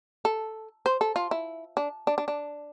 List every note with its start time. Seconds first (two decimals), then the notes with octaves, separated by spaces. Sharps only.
0.25 A4
0.86 C5
1.01 A4
1.16 F4
1.31 E4
1.77 D4
2.07 D4
2.18 D4
2.28 D4